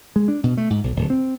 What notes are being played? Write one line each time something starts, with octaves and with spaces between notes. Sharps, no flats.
G#3
D4
B2
A3
G#2
B1
D1
C4